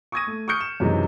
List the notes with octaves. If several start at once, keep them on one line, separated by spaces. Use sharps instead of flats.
C#6 D#6 E6 G#6 A#6 D#7
A3
C#6 D#6 F6 G6 C#7
E7
F#2 C3 E3 G#3 D#4